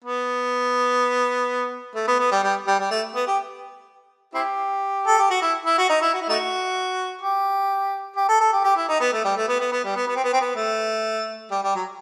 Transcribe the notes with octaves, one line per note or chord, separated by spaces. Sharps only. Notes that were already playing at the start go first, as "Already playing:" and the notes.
B3
A3
B3
B3
G3
G3
G3
G3
A3
B3
G4
C4 E4 G4
A4
G4
F#4
E4
E4
F#4
D#4
E4
F#4
E4
A3 D#4 F#4
G4
G4
A4
A4
G4
G4
E4
D#4
B3
A3
G3
A3
B3
B3
B3
G3
B3
B3
C4
B3
C4
B3
A3
G3
G3
F#3